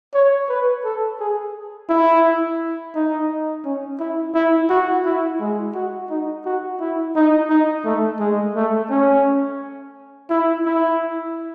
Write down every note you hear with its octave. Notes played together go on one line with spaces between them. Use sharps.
C#5
B4
A4
G#4
E4
D#4
C#4
E4
E4
F#4
E4
G#3
F#4
D#4
F#4
E4
D#4
D#4
A3
G#3
A3
C#4
E4
E4